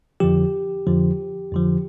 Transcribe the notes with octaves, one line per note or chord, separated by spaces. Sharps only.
F2 D3 F3 G4
F2 D3 F3
F2 D3 F3